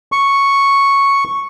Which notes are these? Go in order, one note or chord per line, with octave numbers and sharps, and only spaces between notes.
C#6